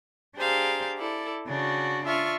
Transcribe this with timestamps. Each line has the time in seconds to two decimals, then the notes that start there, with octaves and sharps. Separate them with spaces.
0.36 D4 G4 G#4 C5 F5 A#5
0.98 E4 A4 D5
1.47 C#3 D4 F#4
2.04 D4 F4 E5 C#6 F6